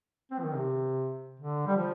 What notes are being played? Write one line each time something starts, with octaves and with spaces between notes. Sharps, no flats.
C4
F3
D#3
C3
D3
G3
F3